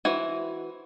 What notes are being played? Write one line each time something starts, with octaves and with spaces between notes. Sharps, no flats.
E3 F#4 C5 F#5 G#5